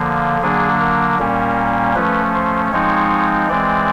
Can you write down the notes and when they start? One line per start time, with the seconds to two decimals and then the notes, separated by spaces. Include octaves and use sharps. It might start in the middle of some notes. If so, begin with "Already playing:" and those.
Already playing: D3 F3 A#3
0.41 D3 F#3 A#3 D4 G#4
0.80 A#4
1.19 A#2 G3 A#3 C#4
1.95 F3 A3 C#4 B4
2.34 C5
2.72 F3 G#3 C4 D#4 C#5
3.49 E3 G#3 C4 D5